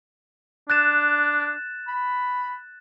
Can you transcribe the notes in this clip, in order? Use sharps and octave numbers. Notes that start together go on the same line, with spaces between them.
D4 F#6 A6 E7
B5